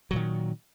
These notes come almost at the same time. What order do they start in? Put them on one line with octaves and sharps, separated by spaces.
F#3 A#2 D#3